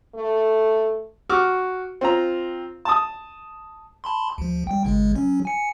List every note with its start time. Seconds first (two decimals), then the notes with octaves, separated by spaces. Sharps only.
0.15 A3
1.29 F#4 C#6 D6 F6
2.01 C4 F4 A#5
2.85 A5 D#6
4.04 A5 B5 C6
4.38 D2 F3
4.67 G3 G5
4.84 G#1 C#3 G#3
5.16 F#3 C#4
5.45 G#5 C#7